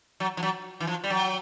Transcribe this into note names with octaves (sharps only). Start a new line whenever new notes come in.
F#3
F3
F#3
E3
F3
G3
F#3